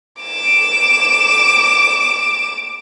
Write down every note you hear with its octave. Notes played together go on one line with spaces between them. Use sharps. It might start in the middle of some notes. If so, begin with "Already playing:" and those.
D6 E7